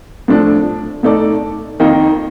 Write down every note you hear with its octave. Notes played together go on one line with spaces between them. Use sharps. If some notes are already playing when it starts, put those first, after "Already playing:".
A2 F3 A3 D4 A4
A2 A3 D#4 A4 D5
F2 D#3 A#3 D#4